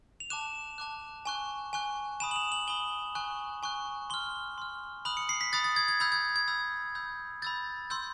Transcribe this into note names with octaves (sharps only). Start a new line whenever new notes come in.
F7
A5 D6 F#6 E7
A5 D6 F#6
G#5 C#6 F#6
G#5 C#6 F#6
G#5 B5 D#6 E7
F#7
F7
F#7
G#5 B5 D#6 G7
G#5 C#6 F#6
G#5 C#6 F#6
C6 F6 G7
C6 F6
B5 D#6 F#6 F#7
C#7
C7
B6
B5 D#6 F#6 A6
A6
G#6
G#6
B5 E6 G6 G#6
G#6
G#6
B5 E6 G6
B5 E6 G6
B5 E6 G6 A6
C6 E6 G6